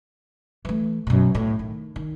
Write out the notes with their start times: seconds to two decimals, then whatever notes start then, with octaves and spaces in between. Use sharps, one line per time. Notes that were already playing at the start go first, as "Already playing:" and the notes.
0.65 E3 A3
1.07 F#2 B2
1.35 A2
1.59 D#3
1.96 D#3